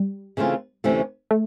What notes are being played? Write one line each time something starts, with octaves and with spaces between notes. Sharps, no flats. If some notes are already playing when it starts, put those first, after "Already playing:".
Already playing: G3
C#3 E3 A3 C4 F4
D2 C3 E3 A3 C#4
A3